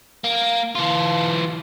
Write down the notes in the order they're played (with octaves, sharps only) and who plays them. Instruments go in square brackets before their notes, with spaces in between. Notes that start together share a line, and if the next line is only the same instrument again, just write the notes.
[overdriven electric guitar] A#3
E3 F4